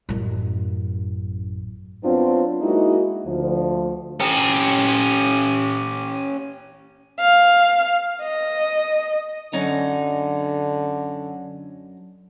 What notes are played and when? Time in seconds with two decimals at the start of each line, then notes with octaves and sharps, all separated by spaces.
0.09 A1 F#2
2.03 F#3 B3 C4 D4 F4 F#4
2.60 G#3 A#3 D#4 E4 F#4 D#5
3.26 D2 F3
4.20 C#4 G4
7.20 F5
8.22 D#5
9.53 F#2 D3 C#4 D#4